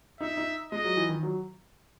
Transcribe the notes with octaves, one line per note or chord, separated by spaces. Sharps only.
D#4 E5
D#4
G#3 D#5
F#3
E3
D#3
F#3